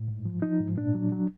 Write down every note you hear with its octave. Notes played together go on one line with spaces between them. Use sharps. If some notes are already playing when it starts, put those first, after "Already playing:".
Already playing: A2
G#2
F3
F3 D#4
G#2
A#2 D4
F#3
F#3